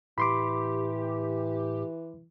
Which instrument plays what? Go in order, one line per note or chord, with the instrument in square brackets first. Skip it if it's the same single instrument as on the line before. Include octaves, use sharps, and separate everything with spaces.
[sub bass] A2 [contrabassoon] E3 [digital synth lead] G4 [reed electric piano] B5 C6 D6